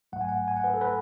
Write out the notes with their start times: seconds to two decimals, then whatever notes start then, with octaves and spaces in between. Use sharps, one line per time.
0.12 A1 G#2 F#3 A3 F#5
0.21 G#5
0.28 F#5
0.48 G#5
0.56 F#5
0.64 B4
0.74 A4
0.81 B4